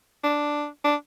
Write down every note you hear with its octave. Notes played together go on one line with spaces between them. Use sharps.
D4
D4